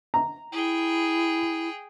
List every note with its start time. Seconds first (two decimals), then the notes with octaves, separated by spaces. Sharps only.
0.14 A#5
0.52 E4 G#4 G5